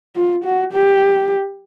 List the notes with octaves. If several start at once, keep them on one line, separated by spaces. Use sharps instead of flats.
F4
F#4
G4